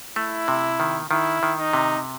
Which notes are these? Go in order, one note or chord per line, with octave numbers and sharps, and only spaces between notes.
A3 E4
C3
D#3
D#3 E4
D#3
D#4
C3